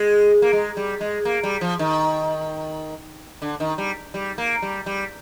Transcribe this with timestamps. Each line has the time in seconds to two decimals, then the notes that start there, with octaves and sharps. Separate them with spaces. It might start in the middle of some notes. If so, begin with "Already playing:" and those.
Already playing: G#3
0.42 A#3
0.53 G#3
0.77 G3
1.01 G#3
1.25 A#3
1.43 G3
1.61 F3
1.79 D#3
3.42 D3
3.60 D#3
3.78 G3
4.14 G3
4.38 A#3
4.62 G3
4.86 G3